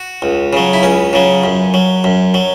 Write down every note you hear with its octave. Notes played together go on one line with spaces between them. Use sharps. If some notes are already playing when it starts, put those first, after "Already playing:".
Already playing: F#4
C#2
C#3 F#3
E4
C#2 C#4
C#3 F#3
F#2
F#3
F#2
F#3